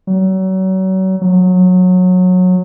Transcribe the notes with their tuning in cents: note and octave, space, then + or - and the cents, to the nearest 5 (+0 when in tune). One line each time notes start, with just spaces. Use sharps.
F#3 +35
F#3 -20